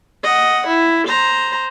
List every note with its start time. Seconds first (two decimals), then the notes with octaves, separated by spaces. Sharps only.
0.23 D#5 F#5
0.67 E4
1.08 C5 A#5